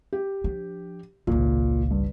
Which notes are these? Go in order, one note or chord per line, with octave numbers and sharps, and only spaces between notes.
G4
F3 D4
G#1 C#2 A#2
G2